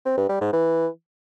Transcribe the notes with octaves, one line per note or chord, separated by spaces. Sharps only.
C4
G2
G3
G#2
E3